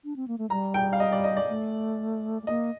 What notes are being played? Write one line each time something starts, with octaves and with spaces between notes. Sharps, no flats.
D4
C4
A#3
A3
G3 A#5
G5
F5
D#5
D5
D#5
D5
A3
A3
A#3 D#5